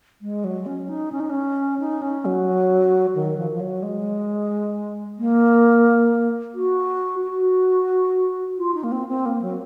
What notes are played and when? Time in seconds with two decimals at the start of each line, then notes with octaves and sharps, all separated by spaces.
0.21 G#3
0.44 F#3
0.66 C#4
0.89 D#4
1.12 C#4
1.20 D#4
1.30 C#4
1.79 D#4
2.02 C#4
2.25 F#3
3.15 D#3
3.38 F3
3.51 F3
3.60 F#3
3.83 G#3
5.18 A#3
6.54 F#4
7.22 F#4
8.58 F4
8.74 D#4
8.83 A#3
8.92 C4
9.08 C4
9.25 A#3
9.42 F#3